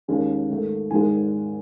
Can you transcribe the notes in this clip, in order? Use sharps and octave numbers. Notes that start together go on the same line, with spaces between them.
D#2 D#3 G#3 C#4
G#2 D#3 A3
G#1 G#2 D#3 G#3 G#5